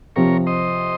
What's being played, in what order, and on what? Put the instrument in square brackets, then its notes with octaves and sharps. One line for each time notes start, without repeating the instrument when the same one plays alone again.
[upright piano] C3 F3 C4 [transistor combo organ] A#4 C#5
[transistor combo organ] C5 D#5